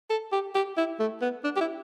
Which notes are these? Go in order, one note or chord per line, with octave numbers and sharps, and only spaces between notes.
A4
G4
G4
E4
A3
B3
D4
G4
E4